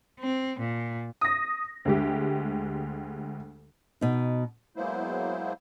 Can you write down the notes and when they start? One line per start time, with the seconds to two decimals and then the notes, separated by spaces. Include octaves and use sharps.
0.20 C4
0.60 A#2
1.21 D#6 A#6
1.85 D2 G#3 G4
4.01 B2 D#4
4.76 F#3 G#3 A#3 B3 E4 C5